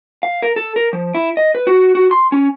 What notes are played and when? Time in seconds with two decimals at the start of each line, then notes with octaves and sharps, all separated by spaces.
0.23 F5
0.42 A#4
0.56 A4
0.76 A#4
0.93 F3
1.15 E4
1.37 D#5
1.55 B4
1.67 F#4
1.95 F#4
2.11 C6
2.32 C#4